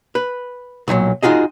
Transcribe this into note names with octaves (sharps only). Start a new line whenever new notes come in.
B4
B1 A#2 E3 F#3
D#4 F4 F#4 G#4 D#5